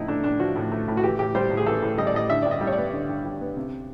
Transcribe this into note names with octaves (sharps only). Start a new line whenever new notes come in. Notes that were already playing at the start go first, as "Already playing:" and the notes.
Already playing: A2 F3 D#4 E4
A3 D4
A2 D4
F3 F#4
A2
A3
A2
F#4
E3 G4
A2 G4
G3 C5
A2
G#4
E3 A4
A2
G3 D#5
D5
A2 D#5
D3 E5
G2 D5
D#5
G3
C#5
D5
B3
D3
G2
G3
B3
C3